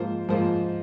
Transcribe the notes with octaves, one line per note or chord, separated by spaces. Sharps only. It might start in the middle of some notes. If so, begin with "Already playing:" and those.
Already playing: G#2 F3 A#3 F4 C5
G#2 F3 A#3 F4 C5